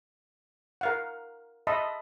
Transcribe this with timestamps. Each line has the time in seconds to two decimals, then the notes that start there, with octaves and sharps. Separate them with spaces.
0.81 A#4 F5 F#5
1.67 D#5 E5 A5 B5 C6